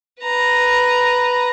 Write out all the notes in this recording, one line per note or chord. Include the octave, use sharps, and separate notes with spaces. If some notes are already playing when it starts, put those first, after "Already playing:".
B4 A#5